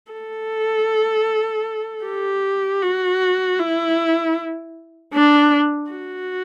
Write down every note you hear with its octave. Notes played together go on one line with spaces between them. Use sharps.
A4
G4
F#4
E4
D4
F#4